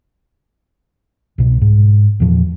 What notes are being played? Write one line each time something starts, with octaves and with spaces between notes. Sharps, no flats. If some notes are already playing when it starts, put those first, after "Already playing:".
C2 B2
G#2
E2 A#2 F3